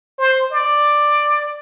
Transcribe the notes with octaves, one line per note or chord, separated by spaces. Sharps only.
C5
D5